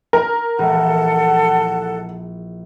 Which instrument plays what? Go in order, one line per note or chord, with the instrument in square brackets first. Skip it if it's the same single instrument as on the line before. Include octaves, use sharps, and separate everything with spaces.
[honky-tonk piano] A#4
[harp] A#1 E3 G#3 [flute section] A4 F#5